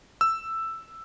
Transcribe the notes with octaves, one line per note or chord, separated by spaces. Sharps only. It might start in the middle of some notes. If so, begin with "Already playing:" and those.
E6